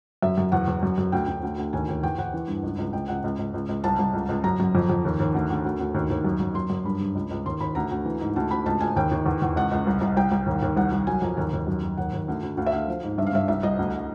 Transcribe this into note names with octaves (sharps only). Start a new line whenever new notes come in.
F#2 E5
F#2
E2 F#5
E2
F#2
F#2
D2 G5
D2 G5
D2
D2
D#2 G#5
D#2 G5
E2 G5
E2 F#5
E3
G2
C#2
C#2
C#2 G5
C#2 F#5
C#2
C#2
C#2
C#2
C2 A5
C2
C#2
C#2
F#2 A#5
F#2
F2
F2
D#2
D#2
D2
D2
D2
D2
D#2
D#2
F#2
F#2
F#2 C6
F#2
G2 B5
G2
C#2
C#2
D#2 C6
D#2 B5
D2 A#5
D2
E3
G#2
D2 A5
D2 B5
C#2 A5
C#2 G#5
D#2 G5
D#2
E2
E2
C#2 F#5
C#2
C2
C2
C2 G5
C2
D#2
D#2
C2 F#5
C2
F#3 G#5
F2 A#5
D#2 A#5
D#2
F#2
F#2
D#2 F#5
D#2
D2
D2
D2 F5
E5
D2 F5
F3
G#2
G2 E5
F5
G2 E5
C2 E5
C2 D#5
D2